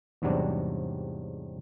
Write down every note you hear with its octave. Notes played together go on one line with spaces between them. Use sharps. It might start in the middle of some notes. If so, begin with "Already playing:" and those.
E2 G#2 C3 F#3 G3 D4